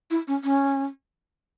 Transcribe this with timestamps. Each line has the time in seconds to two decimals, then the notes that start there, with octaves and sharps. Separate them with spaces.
0.11 E4
0.28 C#4
0.44 C#4